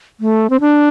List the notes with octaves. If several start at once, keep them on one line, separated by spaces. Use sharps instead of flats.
A3
C4
D4